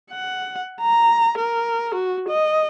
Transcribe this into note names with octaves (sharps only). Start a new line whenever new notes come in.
F#5
A#5
A#4
F#4
D#5